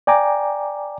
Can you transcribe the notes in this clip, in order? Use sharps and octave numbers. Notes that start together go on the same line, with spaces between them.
D5 G5 G#5 A#5 D6